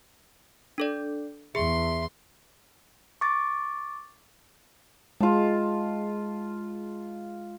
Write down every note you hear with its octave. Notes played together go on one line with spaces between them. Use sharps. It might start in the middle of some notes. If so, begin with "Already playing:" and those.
D4 A4 D5
E2 G#4 E5 C6
C#6 D6 A6
G#3 F4 A5